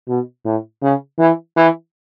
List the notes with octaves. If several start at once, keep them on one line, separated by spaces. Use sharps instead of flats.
B2
A2
C#3
E3
E3